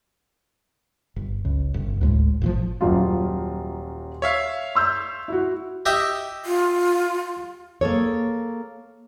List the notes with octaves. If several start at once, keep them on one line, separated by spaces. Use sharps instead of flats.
G1
C#2
G1
D2 A2 G#3
G#1 A#2 F3
D#1 F#2 F4
C#5 E5 F5
C6 E6 G6
E4 F#4
G4 D#5 E5
F4
A#3 G#4 A4 C#5